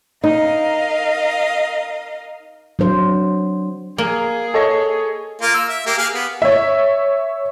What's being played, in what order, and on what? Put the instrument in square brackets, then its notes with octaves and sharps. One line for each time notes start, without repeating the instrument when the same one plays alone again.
[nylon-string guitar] D#4 [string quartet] A#4 D#5 F5
[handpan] F#3 D4 C5
[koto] A#3 [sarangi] G#4
[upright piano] A4 C#5 D#5
[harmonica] A#3 F4
E6
E5
A#3 G4
G4 G#4 F5
B3
[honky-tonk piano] C#5 E5